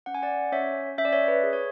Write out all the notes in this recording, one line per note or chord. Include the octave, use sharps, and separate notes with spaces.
C#4 F#5
G#5
D5 F#5
C#4 C#5 E5
C#4 E5
D5
C#5 E5
B4
G#4
C#5